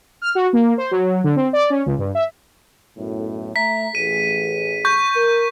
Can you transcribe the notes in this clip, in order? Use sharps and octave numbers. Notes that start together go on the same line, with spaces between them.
F6
F#4
A#3
C5
F#3
D3
C4
D5
C#4
C#2
G2
E5
B1 F#2 A2
A3 E5 A#5 B6
A1 G#4 D#7
C#6 G6
A#4